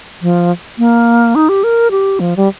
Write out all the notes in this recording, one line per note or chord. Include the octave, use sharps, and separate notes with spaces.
F3
A#3
D#4
G4
A#4
G4
F3
G3